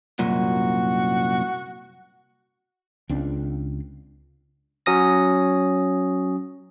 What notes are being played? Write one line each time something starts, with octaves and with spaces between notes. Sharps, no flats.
C2 F#2 A#2 F#4
C#2 C4 D4
F#3 C#4 D#6 A#6